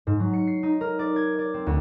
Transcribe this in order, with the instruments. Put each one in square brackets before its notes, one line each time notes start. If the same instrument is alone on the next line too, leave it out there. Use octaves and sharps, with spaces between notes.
[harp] G#2
F#3
C#7
C7
D#4
A#4
D5
G#6
D5
C4
D2